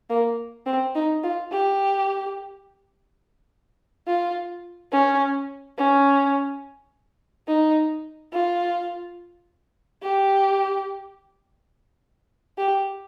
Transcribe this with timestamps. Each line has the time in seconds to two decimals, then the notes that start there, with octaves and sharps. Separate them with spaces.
0.10 A#3
0.66 C4
0.95 D#4
1.23 F4
1.52 G4
4.07 F4
4.92 C#4
5.78 C#4
7.47 D#4
8.33 F4
10.03 G4
12.58 G4